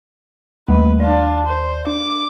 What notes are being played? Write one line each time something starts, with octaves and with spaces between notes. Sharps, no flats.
D#2 G3 A3 A#3 B4
D4 F4 D5
C5
D4 D6